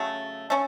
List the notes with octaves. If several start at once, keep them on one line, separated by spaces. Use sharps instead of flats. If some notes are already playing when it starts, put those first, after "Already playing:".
Already playing: C#3 F#3 A3
A3 C#4